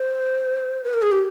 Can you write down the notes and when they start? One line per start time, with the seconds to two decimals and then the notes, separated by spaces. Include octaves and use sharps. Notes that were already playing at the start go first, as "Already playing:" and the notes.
Already playing: C5
0.84 B4
0.94 A#4
1.02 G#4
1.12 G4